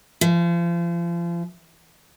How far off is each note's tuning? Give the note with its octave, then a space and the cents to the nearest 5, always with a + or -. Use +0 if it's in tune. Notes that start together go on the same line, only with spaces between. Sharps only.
F3 -35